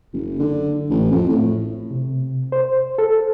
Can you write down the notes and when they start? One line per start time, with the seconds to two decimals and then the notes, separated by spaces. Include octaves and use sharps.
0.14 F#1
0.39 D3
0.90 A1
1.12 F2
1.29 A2
1.91 C3
2.52 C5
2.98 A4